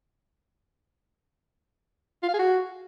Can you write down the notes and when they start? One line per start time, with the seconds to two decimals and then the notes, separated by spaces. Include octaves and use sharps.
2.23 F4
2.28 F5
2.34 G#4
2.39 F#4